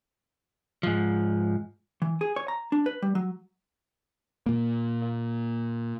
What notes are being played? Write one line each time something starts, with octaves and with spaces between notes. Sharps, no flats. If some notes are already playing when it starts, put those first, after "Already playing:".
G#2 F3
E3
G#4
C#5
A#5
D4
B4
G3
F#3
A#2 A#3